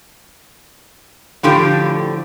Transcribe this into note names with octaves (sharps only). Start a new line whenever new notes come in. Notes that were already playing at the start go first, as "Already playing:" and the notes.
A2 D3 F3 G4